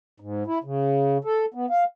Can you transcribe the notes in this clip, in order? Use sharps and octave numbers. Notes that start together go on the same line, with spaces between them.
G#2
E4
C#3
A4
B3
F5